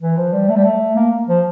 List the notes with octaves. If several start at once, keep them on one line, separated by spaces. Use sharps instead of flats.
E3
F3
G3
A3
G3
A3
A#3
F3